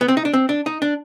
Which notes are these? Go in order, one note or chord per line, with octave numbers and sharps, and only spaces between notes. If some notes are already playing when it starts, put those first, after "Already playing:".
B3
C4
D#4
D4
C4
D4
D#4
D4